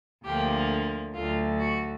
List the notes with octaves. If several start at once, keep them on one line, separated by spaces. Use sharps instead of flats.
D2 D3 F3 A#3 G4
D2 D3 F#3 A3 F4
F#4